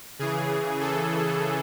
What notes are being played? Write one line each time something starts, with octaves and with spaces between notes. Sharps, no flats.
C#3 E3 G#4
A4